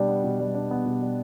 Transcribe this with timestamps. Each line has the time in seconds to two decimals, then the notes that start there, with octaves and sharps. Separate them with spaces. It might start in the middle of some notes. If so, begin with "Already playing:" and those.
Already playing: B2 G3 D4
0.08 B3
0.24 B2
0.40 G3
0.55 D4
0.71 B3
0.86 B2
1.02 G3